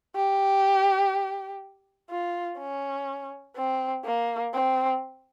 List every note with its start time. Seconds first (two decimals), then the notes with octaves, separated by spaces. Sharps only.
0.15 G4
2.10 F4
2.59 C#4
3.56 C4
4.05 A#3
4.54 C4